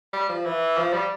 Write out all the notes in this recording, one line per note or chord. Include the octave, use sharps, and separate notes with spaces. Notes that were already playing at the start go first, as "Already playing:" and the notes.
G3
F3
E3
F3
G3